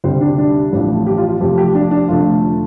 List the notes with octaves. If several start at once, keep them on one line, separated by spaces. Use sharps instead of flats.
D2 C3 G3 C5
D4
D4
A1 A2 F3 A3
G4
F4
F4
F1 F2 F3 A3 G4
G4
D4
D4
F1 F2 D3 A3 F4